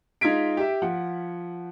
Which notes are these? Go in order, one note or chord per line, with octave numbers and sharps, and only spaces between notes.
G#3 D#4 F4 G#6 B6 D7
G4 E5
F3 F#5